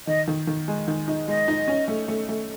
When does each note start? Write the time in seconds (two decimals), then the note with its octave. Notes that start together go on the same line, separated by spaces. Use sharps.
0.07 D#3 D#5
0.28 D#3
0.47 D#3
0.68 G#3
0.88 D#3
1.08 D#4
1.28 G#3 D#5
1.48 D#4
1.68 C#4
1.88 A3
2.08 A3
2.29 A3